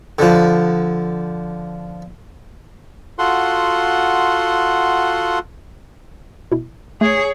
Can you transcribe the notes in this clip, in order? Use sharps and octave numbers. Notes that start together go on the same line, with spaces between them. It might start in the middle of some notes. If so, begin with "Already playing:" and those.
D3 F3
F4 F#4 A4 F#5 C6
B2 E4
A3 G#4 C#5 D7